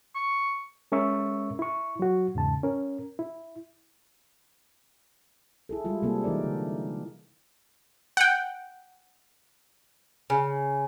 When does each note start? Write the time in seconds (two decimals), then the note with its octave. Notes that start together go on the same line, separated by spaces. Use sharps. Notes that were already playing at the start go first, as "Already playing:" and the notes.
0.15 C#6
0.92 G#3 C#4 A#4 E5 C#6 E6
1.59 E4 C#6
1.99 F#3 F#4
2.35 E2 G#2 C#3 A5
2.63 C#4 A#4
3.19 E4
5.69 E4 G#4 A4
5.84 G3 G#3 E4 F4
6.03 C3 G3 A#3 C4 G#4 A4
6.24 E3 D#4 A#4 D5
6.44 D3
8.17 F#5 G5
10.30 C#3